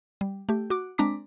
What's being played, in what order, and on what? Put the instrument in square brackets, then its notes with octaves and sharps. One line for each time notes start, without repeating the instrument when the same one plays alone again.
[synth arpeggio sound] G3
A3 G4
F#4 D6
G#3 C4 D4 A#5 D6 B6